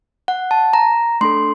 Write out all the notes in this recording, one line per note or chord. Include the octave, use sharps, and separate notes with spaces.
F#5
A5
A#5
A3 D4 A4 C6